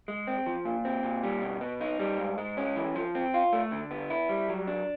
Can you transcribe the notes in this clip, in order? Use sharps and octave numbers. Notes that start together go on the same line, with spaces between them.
G#3
C4
F3
A#2
C4
A#2
G3
B2
B3
D#4
G3
G#2
G#3
C#4
E3
F3
C4
F4
A3
D3
B3
E4
G3
F#3
D4